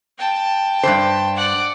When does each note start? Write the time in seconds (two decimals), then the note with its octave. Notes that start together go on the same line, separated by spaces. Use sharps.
0.19 G5 A5
0.83 G2 E3 C5
1.36 D5 F#5